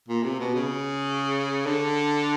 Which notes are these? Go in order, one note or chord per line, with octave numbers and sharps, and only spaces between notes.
A#2
C3
B2
C#3
D3